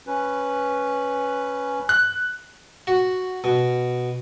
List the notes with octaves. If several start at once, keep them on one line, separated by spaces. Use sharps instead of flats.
C#4 B4
F#6
F#4
B2